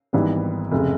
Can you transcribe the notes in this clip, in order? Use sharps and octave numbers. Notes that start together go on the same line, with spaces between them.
G#1 G#2 E3 G3 B3
F1 C#3